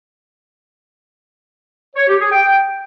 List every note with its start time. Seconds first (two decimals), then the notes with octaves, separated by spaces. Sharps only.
1.96 C#5
2.08 G4
2.20 G#4
2.32 G5